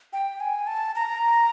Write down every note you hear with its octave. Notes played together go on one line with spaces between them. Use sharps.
G5
G#5
A5
A#5